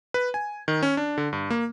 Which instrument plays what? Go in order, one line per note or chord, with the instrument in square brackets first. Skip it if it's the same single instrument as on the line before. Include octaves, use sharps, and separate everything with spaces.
[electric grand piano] B4
G#5
D#3
C#4
D4
D3
G2
A#3